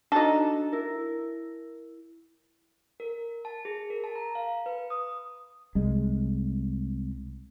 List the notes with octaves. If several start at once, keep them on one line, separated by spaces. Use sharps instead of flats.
D4 D#4 F#4 A4
E4 A#4
A#4
A5
G#4
A#4
A5
A#5
F5
B4
D#6
C2 G#3